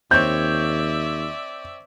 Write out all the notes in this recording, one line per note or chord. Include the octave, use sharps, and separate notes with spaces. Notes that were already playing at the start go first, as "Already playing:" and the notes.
D#2 C4 C#5 D5 E5 G6